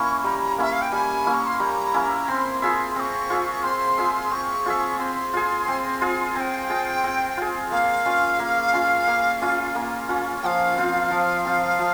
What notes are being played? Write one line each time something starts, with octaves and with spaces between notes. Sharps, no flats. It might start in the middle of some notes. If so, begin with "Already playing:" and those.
Already playing: A#3 C#4 E4 C#6
G3 A#5
A#3 C#4 E4 E5
F5
G5
G3 G#5
A#3 C#4 E4
C#6
C6
G3 A#5
A#3 C#4 E4
C4 C6
F4 G#4 E5
C4 C#6 E6
F4 G#4 E5
C4 C6
F4 G#4 E5
C4 C#6
F4 G#4 E5
C4 C6
F4 G#4
C4
F4 G#4
C4 G5 G#5
F4 G#4
C4
F4 G#4
A#3 F5
C#4 F4
A#3
C#4 F4
A#3
C#4 F4
A#3
C#4 F4
F3 F5 G5
C4 F4
F3
C4 F4
F3